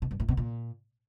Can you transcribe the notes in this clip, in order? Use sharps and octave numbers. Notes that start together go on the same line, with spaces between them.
B2
G2
A2
B2
A#2